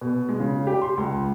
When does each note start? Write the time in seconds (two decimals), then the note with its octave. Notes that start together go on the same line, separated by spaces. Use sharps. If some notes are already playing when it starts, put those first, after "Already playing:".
0.01 B2
0.29 G#3
0.40 C#3
0.67 G4
0.82 C6
0.98 C#2